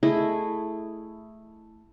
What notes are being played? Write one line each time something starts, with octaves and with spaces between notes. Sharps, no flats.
A3 E4 G#4 D#5